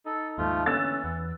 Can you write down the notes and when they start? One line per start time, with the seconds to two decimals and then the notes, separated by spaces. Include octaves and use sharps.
0.06 D#4 A4
0.38 D#2 G#2 F3 A3 F4
0.66 D3 E3 C#4 E6 F#6 A6
1.04 E2 B3